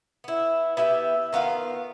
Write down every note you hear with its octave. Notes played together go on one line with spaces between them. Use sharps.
B3 E4
B3 E4 G4 E5
D#3 B3 F4 F5